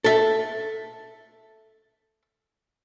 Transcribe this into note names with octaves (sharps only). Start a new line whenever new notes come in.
A4 E5